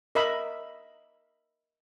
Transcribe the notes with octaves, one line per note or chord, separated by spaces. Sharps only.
A#4 D#5 E5 B5